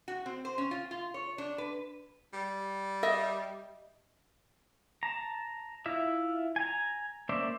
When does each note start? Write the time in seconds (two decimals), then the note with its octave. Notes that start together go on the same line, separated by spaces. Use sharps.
0.08 F#4
0.26 C4
0.45 C5
0.58 C#4
0.71 F4
0.91 F4
1.14 C#5
1.38 D4
1.58 B4
2.33 G3
3.03 D#5 E5
5.03 A5 A#5
5.86 E4 F4 E5
6.56 G#5 A#5
7.29 A#3 C#4 C5 D5 E5